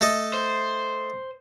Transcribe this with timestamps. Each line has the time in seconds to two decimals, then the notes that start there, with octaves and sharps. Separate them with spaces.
0.01 A3 A4 D#5
0.34 C5